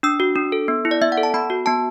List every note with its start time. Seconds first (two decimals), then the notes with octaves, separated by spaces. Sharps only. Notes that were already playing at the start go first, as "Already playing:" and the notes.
0.03 D4 E6
0.20 F#4
0.36 D4
0.52 A4
0.68 B3
0.85 E4
0.91 D5
1.01 B3 E5
1.12 F#5
1.17 A4
1.23 A5
1.34 B3 B5
1.50 F#4
1.66 B3 A5